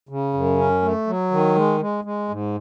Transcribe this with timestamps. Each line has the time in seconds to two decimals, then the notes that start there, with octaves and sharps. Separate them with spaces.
0.09 C#3
0.34 F#2
0.58 C#4
0.82 A3
1.07 F#3
1.31 D#3
1.56 G#3
1.81 G#3
2.05 G#3
2.29 G#2